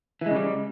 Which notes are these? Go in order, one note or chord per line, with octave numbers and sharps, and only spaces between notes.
C#3 E3 G3 G#3